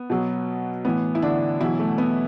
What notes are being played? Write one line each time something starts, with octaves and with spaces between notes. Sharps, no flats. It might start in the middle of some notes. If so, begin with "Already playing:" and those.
Already playing: B3
B2 F#3
A2 E3 B3
E4
D3 D4
B2 E3 F#3 E4
A3
B3